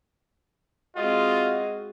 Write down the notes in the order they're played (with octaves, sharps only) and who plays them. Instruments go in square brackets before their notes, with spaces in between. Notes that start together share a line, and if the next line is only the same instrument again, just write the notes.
[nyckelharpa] G#3 C4 [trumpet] F4 [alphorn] F#4 [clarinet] D#5